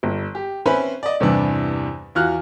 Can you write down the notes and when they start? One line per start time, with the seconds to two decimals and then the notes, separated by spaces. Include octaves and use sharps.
0.03 G1
0.35 G4
0.66 C4 C#4 B4 C5 E5 B5
1.03 D5 D#5
1.20 E2 G2 C3 E3 B3 D4
2.15 E2 F4 F#4 F6 F#6